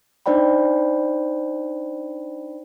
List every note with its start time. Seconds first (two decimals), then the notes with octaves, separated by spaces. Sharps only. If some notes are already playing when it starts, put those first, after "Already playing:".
0.26 D4 D#4 C5 D5 G5 B5